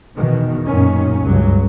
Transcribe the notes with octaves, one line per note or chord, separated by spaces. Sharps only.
E2 B2 D#3
F#2 A#2 D#3 C#4
C#2 G2 F#3